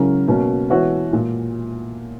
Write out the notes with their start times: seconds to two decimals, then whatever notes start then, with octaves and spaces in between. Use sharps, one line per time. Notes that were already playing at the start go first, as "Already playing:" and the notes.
Already playing: C#3 F#3 C#4 E4 A#4
0.28 B2 A#3 C#4
0.70 E3 B3 F#4 C#5 E5
1.13 A#2